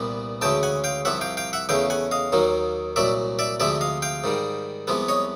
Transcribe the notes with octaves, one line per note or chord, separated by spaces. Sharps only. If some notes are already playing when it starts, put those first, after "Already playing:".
Already playing: C2 A#2 G3 B3
D2 C#3 E3 G#3 G5 A5
F#5 G#5
F5 G5
C2 C3 F3 E5 F#5
F5 G5
F5 G5
E5 F#5
E2 C#3 E3 A3 F5 G5
F#5 G#5
D#5 F5
D#2 D#3 F#3 A#3
C2 A#2 F#3 D5 E5
D5 E5
D2 C3 F3 G#3 D5 E5
D#5 F5
F5 G5
G#2 D#3 G3
C2 C3 F3 G#3 B3
C#5 D#5